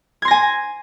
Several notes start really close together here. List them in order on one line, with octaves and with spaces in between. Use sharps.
G#6 C6 A#6 G#5